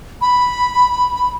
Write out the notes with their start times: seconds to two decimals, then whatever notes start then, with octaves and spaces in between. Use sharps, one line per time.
0.21 B5